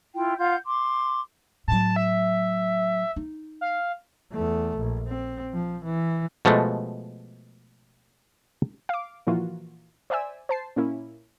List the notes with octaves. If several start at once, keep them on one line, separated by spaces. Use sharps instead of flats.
E4 F4 G5
F4 F5 F#5 G6
C6 D6
A2 F#3 A5
E5
D#4
F5
E2 A3
A#1
C4
F3
E3
B2 F3 G#3 A3
F5 D6
A#2 E3 F3 A#3 F4 F#4
C5 D5 E5 G#5 E6
C5 A5 C7
A#2 A#3 C#4 E4